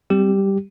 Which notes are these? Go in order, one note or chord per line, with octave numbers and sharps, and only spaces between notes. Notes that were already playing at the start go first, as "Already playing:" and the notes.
G3 C4 G4